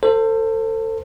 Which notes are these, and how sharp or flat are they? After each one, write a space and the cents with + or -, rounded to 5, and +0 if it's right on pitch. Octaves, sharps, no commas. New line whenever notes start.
A4 +30 C5 +0